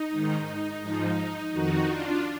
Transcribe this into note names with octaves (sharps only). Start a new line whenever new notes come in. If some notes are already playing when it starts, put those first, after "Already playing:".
Already playing: D#4
G#2 D#3
G#2 F3 D#4
F2 D#3 D#4 F#4
D4 F4